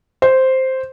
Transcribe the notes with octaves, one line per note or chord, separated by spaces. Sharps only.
C5